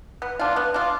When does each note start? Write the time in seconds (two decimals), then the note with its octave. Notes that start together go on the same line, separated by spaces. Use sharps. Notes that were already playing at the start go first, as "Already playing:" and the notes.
0.22 B3
0.39 D4 F4
0.56 B3
0.74 D4 F4